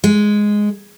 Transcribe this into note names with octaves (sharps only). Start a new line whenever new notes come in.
G#3